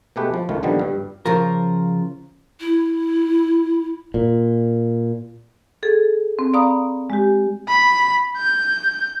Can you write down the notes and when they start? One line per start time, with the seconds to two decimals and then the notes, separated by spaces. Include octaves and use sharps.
0.16 B2 G#3 A3 G4 B4
0.34 F3
0.49 G1 C#2 D#3 A3 F4
0.63 A#2 D3 D#3 F3 G3 B3
0.79 G2 G3
1.26 C#3 F3 F4 A#4
2.60 E4
4.14 A#2
5.83 G#4 A4
6.39 C4
6.54 D5 F5 A#5 B5 D#6
7.10 G#3 G4
7.68 B5
8.37 G6